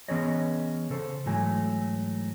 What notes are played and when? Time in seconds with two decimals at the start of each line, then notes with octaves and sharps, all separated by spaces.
0.08 E3 B3 C#4 G#4 C#5 D#5
0.90 C#3 A4 C5
1.26 G#2 E3 F#3 A3 G#5